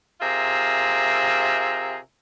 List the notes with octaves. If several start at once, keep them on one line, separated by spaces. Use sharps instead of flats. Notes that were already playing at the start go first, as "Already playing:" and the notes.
C3 F4 G#4 A#4 E5